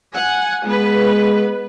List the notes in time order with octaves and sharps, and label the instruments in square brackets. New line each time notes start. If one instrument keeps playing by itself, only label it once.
[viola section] F#5 G#5
[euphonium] G#3 [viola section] B3 B4